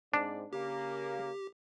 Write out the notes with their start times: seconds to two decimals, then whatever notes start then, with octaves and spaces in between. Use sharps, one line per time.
0.14 G#2 C4 D4 D5
0.53 C#3 A#3 G4